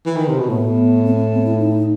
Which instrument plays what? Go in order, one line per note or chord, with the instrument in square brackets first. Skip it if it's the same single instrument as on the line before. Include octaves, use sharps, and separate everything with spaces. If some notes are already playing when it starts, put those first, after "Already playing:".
[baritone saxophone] E3
D#3
C3
B2
[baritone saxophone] A2 [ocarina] B3
[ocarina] C4
B3
C4
E4
D#4